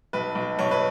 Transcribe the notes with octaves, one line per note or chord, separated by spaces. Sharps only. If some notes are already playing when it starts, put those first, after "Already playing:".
B1 B4
B1
B1 C#5
B4